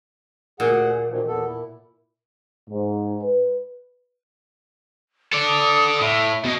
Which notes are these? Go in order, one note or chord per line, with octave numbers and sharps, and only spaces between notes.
D2 A#2 G#4 F#5
B2 D#3 F3
E2 B3 A4
E4
G#2
B4
A4 D5
D#6
A2 E5
B2 D#5